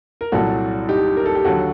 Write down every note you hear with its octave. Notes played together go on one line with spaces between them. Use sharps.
A#4
C2 A#2 F#3 F#4 A4
D#4 G4
A#4
A4
G4
D#2 D3 F#3 F#4 A4